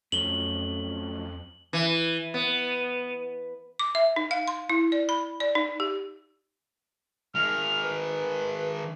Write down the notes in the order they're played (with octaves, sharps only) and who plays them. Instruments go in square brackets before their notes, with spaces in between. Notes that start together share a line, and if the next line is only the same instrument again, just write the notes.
[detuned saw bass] F2 [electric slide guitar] F#3 A3 C#4 [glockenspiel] F#7 G7
[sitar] E3
B3
[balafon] D6
E5
D#4
F5
C6
E4
D5
B5
D5
D#4
G4
[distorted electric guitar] D#3 G#3 [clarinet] F6
[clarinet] B4